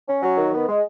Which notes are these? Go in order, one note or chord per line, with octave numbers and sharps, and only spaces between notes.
C#4
F#3
D#3
B3
G#3